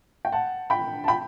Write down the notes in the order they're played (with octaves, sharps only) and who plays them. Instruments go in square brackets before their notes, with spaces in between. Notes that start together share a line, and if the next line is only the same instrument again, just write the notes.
[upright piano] G5
F#5 A5
G5 B5
A5
G5 B5